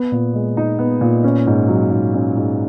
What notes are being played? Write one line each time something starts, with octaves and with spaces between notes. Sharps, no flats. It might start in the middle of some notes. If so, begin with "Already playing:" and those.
Already playing: B3
A#2
G#3
D#4
B3
A#2
C#4
G#2
F#3
G#2
C#4
G#2